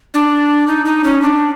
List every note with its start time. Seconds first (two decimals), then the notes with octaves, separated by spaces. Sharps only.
0.14 D4
0.67 D#4
0.85 D#4
1.04 C#4
1.22 D4